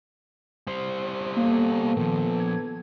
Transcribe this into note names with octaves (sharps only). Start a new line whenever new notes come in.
G3 C5
A#3 B3 A4
A#2 D#3 F3
G#6